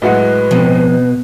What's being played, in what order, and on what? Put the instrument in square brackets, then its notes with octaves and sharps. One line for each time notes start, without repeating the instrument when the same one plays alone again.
[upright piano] A2 F#3 G#3 [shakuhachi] B4 [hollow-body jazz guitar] D#5 E5 F#5
[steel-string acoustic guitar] B2 [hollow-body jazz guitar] F3 C4